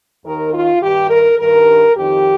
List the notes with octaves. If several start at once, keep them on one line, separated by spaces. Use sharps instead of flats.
D#2 D#3 A#4
F4
G2 D#3 G4
A#4
G2 D#3 A#4
F2 D#3 G4